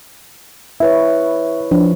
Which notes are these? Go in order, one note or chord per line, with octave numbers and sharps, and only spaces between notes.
E4 B4 C#5 E5
F3 D4